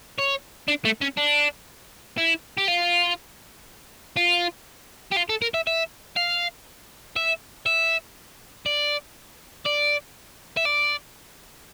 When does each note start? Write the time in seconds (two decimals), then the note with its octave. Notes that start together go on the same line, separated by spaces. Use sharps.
0.18 C#5
0.68 D4
0.85 A3
1.02 C#4
1.18 D4
2.18 E4
2.57 G4
2.68 F4
4.17 F4
5.12 G4
5.17 F4
5.30 A4
5.42 A#4
5.54 E5
5.67 E5
6.17 F5
7.16 E5
7.66 E5
8.66 D5
9.66 D5
10.57 E5
10.65 D5